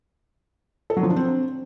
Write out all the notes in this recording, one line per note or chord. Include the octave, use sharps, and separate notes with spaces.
A4
F#3
F3
D4
C4